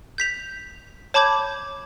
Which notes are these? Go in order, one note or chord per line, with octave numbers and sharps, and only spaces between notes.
G6 B6 F7
C#5 A5 B5 D6 G6 G#6